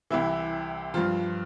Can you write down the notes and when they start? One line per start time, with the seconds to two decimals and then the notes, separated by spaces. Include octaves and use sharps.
0.10 C2 C3 E3 E4
0.94 G2 F3 F4